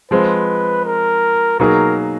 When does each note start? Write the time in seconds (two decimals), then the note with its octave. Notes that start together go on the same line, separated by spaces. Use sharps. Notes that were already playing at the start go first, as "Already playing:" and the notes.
0.11 F3 G#3 C4 B4
0.85 A#4
1.59 B2 F#3 A#3 D#4 G#4 A#4